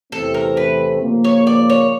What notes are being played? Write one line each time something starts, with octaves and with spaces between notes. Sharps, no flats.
E2 C3 E3 A3 C4 A4
A#4
B4
C#3 F3 A#3
C#5
D5
C#5